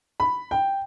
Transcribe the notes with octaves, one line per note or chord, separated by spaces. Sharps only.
B5
G5